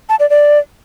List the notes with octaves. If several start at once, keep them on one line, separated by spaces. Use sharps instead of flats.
A5
D5
D5